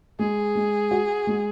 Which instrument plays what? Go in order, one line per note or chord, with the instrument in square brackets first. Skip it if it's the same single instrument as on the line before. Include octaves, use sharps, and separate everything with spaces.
[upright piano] G#3 [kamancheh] G#4
[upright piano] G#3
F#4
G#3